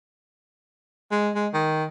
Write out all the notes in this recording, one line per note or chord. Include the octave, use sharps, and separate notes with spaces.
G#3
G#3
D#3